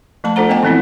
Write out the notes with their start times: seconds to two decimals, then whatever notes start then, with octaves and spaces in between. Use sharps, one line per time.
0.24 F3 A3 A5 B5
0.36 D4 F4 A4 C5 F#5 A#5
0.49 B3 A4 D#5 G5 G#5
0.63 E3 F3 G#3 C4 D4 E4